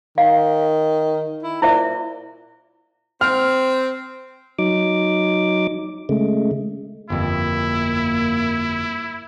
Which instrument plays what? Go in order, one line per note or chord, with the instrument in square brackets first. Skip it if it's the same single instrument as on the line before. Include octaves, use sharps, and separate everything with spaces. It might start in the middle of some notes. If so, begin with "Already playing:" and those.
[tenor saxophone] D#3 [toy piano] F5
[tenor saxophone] E4
[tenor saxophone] A#2 [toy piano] E4 C5 E5
[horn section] C4 [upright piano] F6
[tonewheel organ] F#3 D#4 D6
C#3 G#3 A3
[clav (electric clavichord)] G1 F2 [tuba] A#3 [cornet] E4